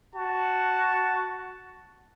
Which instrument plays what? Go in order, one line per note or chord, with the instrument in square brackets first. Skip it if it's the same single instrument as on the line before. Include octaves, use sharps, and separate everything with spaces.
[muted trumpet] F#4 [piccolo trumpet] A5